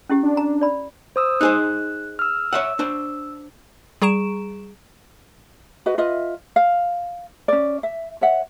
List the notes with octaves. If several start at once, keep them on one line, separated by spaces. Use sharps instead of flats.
C#4 E4 G4
D4
A#5
D5 B5
C5 D#6 E6
D#4 G#4 C5 F#6
E6 F6
C#5 E5 F#5 E6
D4 C5
G3 G#4 A#5 C#6 D7 E7
F#4 B4 D#5
F4 B4 D#5 E5
F5
C#4 D5
E5
C#5 E5 F#5